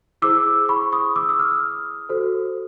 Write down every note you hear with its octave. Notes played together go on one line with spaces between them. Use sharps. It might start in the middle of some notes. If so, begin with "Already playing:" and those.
E4 G#4 C5 D6 E6
B5 C#6
C#6 D#6
D6 E6
E6
D#6 F6
F#4 A4 C5